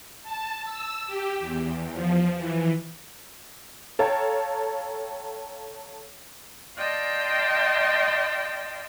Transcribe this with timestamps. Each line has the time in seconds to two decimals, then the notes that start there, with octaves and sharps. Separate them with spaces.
0.23 A5
0.64 E6
1.07 G4
1.40 E2
1.93 F3
2.38 E3
3.99 A4 C#5 F5 G5 A5 A#5
6.77 D5 D#5 F5 G5 A5 C6